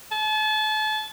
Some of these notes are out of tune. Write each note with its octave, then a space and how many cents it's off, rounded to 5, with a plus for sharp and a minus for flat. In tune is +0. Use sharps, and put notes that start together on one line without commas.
A5 -35